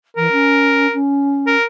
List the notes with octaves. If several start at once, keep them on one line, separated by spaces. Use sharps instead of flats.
E3 A#4
C#4
C#4
A#4